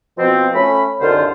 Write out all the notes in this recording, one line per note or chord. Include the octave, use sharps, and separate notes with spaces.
B2 F3 C4
A3 C#4 B5
C2 F#2 D3 D#3 F4 C5